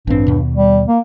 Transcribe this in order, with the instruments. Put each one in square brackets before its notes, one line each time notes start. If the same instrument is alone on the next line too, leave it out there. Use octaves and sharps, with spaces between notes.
[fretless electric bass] A1 C4 [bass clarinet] G2
[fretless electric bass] D#2 B2
[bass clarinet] G3
A#3